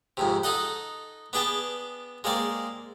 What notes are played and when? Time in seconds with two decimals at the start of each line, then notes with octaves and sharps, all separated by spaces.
0.17 F2 G#2 C3
0.43 D#4 A4 D#5 F#5
1.33 B3 D4 G#4 G5 A5
2.24 G#3 A#3 C4 D5